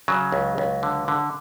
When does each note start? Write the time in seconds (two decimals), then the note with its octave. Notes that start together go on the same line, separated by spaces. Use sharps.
0.08 C#3 F#3
0.32 C#2
0.58 C#2
0.83 D3
1.08 D3